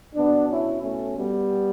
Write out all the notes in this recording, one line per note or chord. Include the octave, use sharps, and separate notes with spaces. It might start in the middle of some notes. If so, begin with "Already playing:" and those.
B2 B3 D4
C#4 E4
A3 C#4
G3 B3